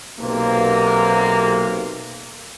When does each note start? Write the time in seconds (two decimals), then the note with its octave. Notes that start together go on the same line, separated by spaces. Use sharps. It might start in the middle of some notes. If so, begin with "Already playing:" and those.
0.20 B1 C3 A#3